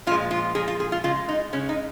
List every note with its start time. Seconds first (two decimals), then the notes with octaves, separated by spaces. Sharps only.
0.07 A#2 F3 G#3 F4
0.31 F4
0.55 A#2 F3 G#3 G#4
0.68 F4
0.80 G#4
0.92 F4
1.04 C#3 G#3 F4
1.29 D#4
1.53 C#3 G#3 C#4
1.69 D#4